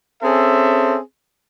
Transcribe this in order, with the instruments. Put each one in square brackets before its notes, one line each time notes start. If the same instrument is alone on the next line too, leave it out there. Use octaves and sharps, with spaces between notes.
[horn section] C4 C#4 G#4 A4 E5